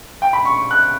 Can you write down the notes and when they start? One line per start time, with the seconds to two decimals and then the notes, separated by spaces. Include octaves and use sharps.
0.22 G5
0.33 B5
0.45 C#6
0.71 F#6